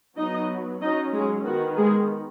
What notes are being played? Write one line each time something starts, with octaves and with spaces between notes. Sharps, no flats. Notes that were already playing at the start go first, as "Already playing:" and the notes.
F#3 B3 D#4 D#5
F#3 C#4 D#4 D#5
G#3 G#4
D#3 B3 F#4
G#3 G#4